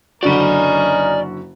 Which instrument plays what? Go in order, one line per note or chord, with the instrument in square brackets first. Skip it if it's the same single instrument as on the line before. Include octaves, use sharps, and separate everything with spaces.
[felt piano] F#1 D3 F#4 [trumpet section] C#4 D#4 A#4 [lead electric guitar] D5 B5